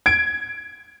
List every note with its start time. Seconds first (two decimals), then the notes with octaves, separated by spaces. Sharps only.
0.06 G#6 D7